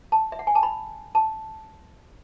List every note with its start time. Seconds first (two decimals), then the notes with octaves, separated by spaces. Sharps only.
0.12 A5
0.32 E5
0.39 F#5
0.47 G#5
0.55 A5
0.63 B5
1.15 A5